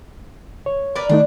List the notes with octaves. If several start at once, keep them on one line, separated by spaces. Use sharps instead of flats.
C#5
A#4 B4 D5
D#3 A3 D4 D#4